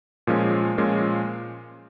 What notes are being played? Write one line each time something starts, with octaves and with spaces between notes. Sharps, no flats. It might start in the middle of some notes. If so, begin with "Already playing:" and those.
A#2 F3 G#3 C#4 F4
A#2 F3 G#3 C#4 F4